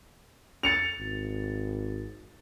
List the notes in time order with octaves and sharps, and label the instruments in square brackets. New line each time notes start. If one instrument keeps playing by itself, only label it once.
[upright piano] A6 C#7 F7
[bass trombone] G#1